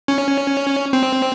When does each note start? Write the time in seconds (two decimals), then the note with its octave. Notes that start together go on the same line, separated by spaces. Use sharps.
0.08 C#4
0.93 C4